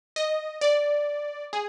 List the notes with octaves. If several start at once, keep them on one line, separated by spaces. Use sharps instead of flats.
D#5
D5
G#4